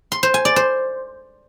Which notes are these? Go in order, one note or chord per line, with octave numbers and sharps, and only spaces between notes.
C6
C5
G#5
D5
C5